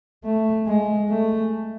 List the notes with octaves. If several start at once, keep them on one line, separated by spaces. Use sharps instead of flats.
A3
G#3
A3